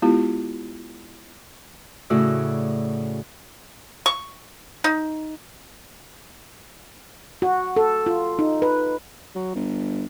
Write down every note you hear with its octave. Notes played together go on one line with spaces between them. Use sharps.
G#3 B3 E4 F4 G4
A2 C#3 F#4 D5 E6
C#6
D#4
F#4
A4
F4
D#4
B4
F#3
G1